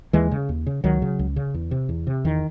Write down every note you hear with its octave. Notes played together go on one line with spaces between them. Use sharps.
D#2 E3 G#3
C#3
D#2
C#3
C#2 D#3 F#3
C#3
C#2
C#3
E2
C3
E2
C3
E2 D#3